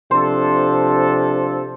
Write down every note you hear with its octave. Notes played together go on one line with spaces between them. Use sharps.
C3 F3 D4 A4 C5